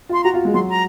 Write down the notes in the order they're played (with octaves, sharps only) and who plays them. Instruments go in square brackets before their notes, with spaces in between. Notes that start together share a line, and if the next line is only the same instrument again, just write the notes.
[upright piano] F4 [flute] C6
[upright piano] F#4 [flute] A#5
[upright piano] F4
G#3
[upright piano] F#3 [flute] C6
[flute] A#5